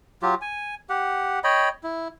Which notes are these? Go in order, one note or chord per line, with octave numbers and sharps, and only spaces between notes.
F#3 F4 G4
G#5
G4 F#5
C#5 D#5 G5 B5
E4